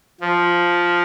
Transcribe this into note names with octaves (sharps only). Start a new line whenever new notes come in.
F3